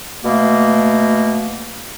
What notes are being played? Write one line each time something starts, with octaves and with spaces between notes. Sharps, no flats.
B2 A3 A#3